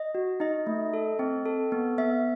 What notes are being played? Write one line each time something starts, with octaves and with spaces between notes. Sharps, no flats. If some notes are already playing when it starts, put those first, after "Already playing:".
Already playing: D#5
F#4
D#4 D#5
A3
A4
C4
A4
B3
B3 E5